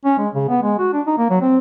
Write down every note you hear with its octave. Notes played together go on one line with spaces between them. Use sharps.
C#4
G#3
C#3
B3
G#3
F#4
D4
D#4
A#3
F#3
C4